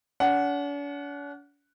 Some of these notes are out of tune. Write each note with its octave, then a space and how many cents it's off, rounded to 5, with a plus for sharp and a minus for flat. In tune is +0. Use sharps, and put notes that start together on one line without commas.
D4 -45 F#5 +0